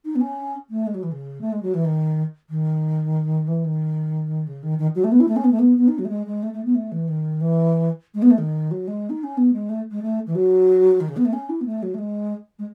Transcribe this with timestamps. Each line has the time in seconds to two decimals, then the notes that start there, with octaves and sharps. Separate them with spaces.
0.05 D#4
0.15 B3
0.20 C#4
0.70 A3
0.86 G#3
0.94 F#3
1.03 E3
1.11 C#3
1.41 A3
1.52 G#3
1.62 F#3
1.74 E3
1.85 D#3
2.49 D#3
3.47 E3
3.64 D#3
4.47 C#3
4.63 D#3
4.78 D#3
4.95 F#3
5.04 A3
5.11 B3
5.20 E4
5.28 A3
5.36 C#4
5.44 B3
5.51 A3
5.59 B3
5.77 B3
5.88 D#4
5.98 F#3
6.05 A3
6.09 G#3
6.26 G#3
6.42 A3
6.53 A3
6.64 B3
6.75 A3
6.92 E3
7.08 D#3
7.41 E3
8.14 G#3
8.22 B3
8.30 A3
8.38 D#3
8.71 F#3
8.87 G#3
9.10 D#4
9.23 C#4
9.37 B3
9.53 G#3
9.69 A3
9.91 G#3
10.02 A3
10.26 E3
10.35 F#3
11.00 D#3
11.08 C#3
11.16 B3
11.25 A3
11.33 C#4
11.49 E4
11.61 B3
11.66 A3
11.82 F#3
11.94 A3
11.98 G#3
12.59 G#3